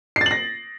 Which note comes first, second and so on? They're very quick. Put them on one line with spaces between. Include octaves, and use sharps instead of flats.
C7 A6 F#7 A#6